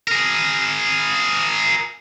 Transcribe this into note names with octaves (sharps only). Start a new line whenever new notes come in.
G#4 A#4